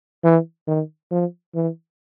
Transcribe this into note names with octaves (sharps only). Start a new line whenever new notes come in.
E3
D#3
F3
E3